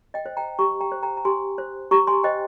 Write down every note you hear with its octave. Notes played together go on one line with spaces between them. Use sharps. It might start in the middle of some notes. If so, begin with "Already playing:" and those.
D#5 G5
C5
G5 A#5
G4 A#5 C#6
G5 A#5
C5
G5 A#5
A#5
G4 G#5 C6
C5
G4 A#5 C#6
G#5 C6
C5 D#5 G5